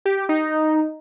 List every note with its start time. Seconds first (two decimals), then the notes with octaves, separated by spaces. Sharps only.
0.05 G4
0.29 D#4